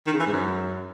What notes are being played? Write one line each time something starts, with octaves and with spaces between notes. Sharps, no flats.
D#3
C#3
E3
G#2
F#2